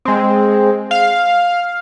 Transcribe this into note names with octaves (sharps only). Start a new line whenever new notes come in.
G#3 C4
F5